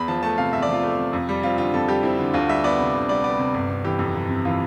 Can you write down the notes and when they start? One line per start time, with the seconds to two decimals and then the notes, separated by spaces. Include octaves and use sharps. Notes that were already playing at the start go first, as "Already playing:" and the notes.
Already playing: E2 B5
0.08 F3 A5
0.23 A3 A5
0.38 C3 F5
0.53 E2 E5
0.62 D5
0.68 F3 F4
0.83 A3
0.99 C3
1.13 F2
1.29 G3
1.43 C4 F4
1.58 D3 F4
1.74 F2 A4
1.88 G3 G4
2.03 C4 E4
2.18 D3
2.33 D2 F4
2.49 G3 E5
2.64 B3 D5
2.79 C3
2.95 D2
3.09 G3 D5
3.24 B3 D5
3.39 C3
3.54 G1
3.70 C3
3.84 E3 G4
3.99 F2
4.15 G1
4.29 C3
4.45 E3 F4